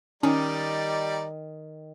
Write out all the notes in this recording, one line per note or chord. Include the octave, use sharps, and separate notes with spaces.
D#3 G3 C#4 D#4 D5